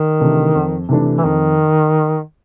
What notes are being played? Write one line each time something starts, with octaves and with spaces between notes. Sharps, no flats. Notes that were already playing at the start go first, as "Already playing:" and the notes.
Already playing: D#3
C3 E3 A3 D4
F2
C3 E3 A3 D4
E3
F2 D#3